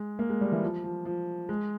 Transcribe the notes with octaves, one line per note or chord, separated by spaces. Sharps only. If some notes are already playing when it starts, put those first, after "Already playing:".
Already playing: G#3
A#3
G#3
G3
E3
F3
F3
F3
G#3